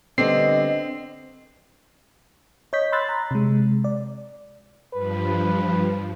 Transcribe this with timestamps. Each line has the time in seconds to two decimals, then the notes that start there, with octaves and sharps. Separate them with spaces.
0.18 D3 G3 B3 C4 D#5 C7
2.73 C#5 D#5 G6 B6
2.92 B5 C6 E6 F#6 A6
3.09 A#5
3.31 C3 G#3
3.85 D5
4.94 G2 F3 B4